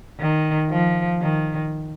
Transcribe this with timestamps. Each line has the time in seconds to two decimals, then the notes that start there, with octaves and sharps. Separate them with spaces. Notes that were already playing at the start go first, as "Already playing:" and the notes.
0.19 D#3
0.70 F3
1.21 D#3